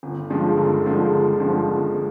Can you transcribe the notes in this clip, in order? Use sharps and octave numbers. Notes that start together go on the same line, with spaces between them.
G1
G2 F3 G#3
G1
G2 F3 G#3
G1
G2 F3 G#3
G1
G#3